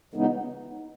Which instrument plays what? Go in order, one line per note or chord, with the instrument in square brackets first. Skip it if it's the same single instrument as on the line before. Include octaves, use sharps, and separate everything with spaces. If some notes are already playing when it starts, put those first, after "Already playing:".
[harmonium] C#3 E3 G#3 B3 D#4